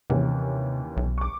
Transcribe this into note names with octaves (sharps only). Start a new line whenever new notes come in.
D#2 C3 E3 C#4
B1
C#6 D6